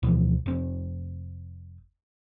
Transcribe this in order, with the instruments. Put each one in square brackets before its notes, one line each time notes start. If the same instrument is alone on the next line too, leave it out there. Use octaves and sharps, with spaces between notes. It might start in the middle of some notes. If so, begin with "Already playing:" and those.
[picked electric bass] D2 B2 E3 F3
F1 C4